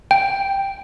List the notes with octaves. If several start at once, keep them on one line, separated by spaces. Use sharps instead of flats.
G5